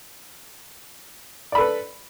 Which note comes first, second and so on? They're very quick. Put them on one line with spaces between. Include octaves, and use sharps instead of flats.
D5 B5 A4 B4